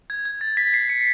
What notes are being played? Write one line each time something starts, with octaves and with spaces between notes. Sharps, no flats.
G#6
G#6
A6
B6
C7
C#7